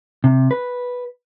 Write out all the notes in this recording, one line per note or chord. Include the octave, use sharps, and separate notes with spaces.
C3
B4